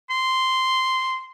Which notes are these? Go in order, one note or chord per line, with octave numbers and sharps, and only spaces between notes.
C6